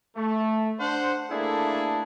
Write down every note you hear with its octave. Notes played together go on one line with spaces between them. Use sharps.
A3
D4 C5 F#5
A3 A#3 D4 E4 G#4 A4